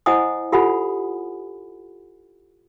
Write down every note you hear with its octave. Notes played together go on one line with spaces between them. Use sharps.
E4 C5 D#5 F#5 G#5 D#6
F4 G4 A4 F#5 G#5 B5